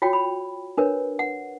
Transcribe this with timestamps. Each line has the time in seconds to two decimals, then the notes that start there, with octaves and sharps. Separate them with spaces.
0.02 F4 F#4 C#5 G5
0.13 B5
0.77 D4 A#4 B4 C#5
1.19 F#5